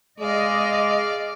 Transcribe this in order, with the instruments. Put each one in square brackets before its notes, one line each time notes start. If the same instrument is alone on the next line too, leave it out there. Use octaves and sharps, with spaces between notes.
[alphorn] G#3 [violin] D5 F5 [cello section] D#5